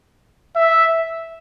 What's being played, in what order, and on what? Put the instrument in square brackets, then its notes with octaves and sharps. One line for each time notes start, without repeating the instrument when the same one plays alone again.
[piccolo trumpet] E5